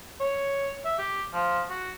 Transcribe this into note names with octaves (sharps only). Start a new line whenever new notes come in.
C#5
E5
G4
F3
F#4